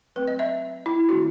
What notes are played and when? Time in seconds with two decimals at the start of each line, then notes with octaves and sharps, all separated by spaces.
0.16 F#3 A3 C4 B4
0.28 D#5
0.39 E5
0.86 E4
1.09 D#3 A3 C4 F#4